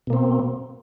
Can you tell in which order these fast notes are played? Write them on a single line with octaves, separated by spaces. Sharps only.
B2 A#3 C4